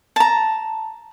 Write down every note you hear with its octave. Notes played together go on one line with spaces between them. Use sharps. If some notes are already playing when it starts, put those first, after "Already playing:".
A5 A#5